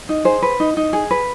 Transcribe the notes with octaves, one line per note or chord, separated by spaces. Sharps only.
D#4
G#4 C5
B4
D#4
D#4
G#4
B4